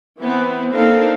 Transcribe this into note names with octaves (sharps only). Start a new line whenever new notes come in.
E3 B3 C4
A#3 C4 D4 D#4 A4 F5